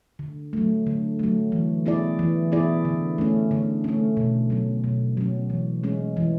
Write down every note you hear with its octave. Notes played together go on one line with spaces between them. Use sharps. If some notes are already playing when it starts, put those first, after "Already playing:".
D3
F#3 A3
D3
F#3 A3
E3
B3 E4 G#4 D5
E3
B3 E4 G#4 D5
D3
A3 C#4
D3
A3 C#4
B2
F#3 C#4
B2
F#3 C#4
E3
G#3 C#4
E3